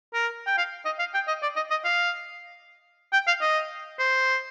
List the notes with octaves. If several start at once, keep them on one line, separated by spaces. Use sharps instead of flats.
A#4
G5
F5
D#5
F5
G5
D#5
D5
D#5
D#5
F5
G5
F5
D#5
C5